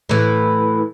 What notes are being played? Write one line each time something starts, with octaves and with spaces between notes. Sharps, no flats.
A2 E3